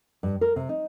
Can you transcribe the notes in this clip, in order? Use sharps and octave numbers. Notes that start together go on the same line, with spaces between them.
G2
A#4
C3
D#4